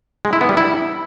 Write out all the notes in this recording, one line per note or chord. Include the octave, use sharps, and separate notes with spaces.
G#3
E4
B3
G3
E4